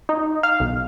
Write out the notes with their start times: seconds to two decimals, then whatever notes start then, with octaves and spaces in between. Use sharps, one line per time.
0.09 D#4
0.43 F5
0.60 B1